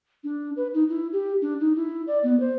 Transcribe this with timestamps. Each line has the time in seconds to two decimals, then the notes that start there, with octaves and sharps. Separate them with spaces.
0.24 D4
0.56 B4
0.74 D#4
0.89 E4
1.13 G4
1.42 D4
1.60 D#4
1.76 E4
2.07 D5
2.23 B3
2.40 C5